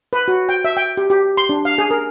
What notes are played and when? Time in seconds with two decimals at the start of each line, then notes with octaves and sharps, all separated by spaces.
0.13 B4
0.28 F#4
0.49 G5
0.65 E5
0.77 G5
0.97 G4
1.10 G4
1.37 C6
1.49 D4
1.65 F5
1.78 G#4
1.91 A#4